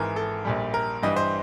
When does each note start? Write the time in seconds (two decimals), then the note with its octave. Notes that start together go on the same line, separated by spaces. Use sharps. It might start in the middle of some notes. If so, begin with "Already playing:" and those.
Already playing: G#1 G#2 E3 A#4
0.16 A4
0.45 A#1 A#2 G3
0.74 A#4
1.03 G2 E3 G3 D#5
1.17 C5